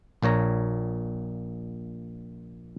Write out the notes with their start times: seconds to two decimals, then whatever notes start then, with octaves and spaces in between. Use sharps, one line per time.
0.22 A#1 A#2 C#5 A#5